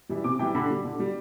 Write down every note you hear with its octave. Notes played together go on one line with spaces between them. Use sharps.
E3 G3
C3 D6
E3 G3 G5
D3 B5
G3
D3
G3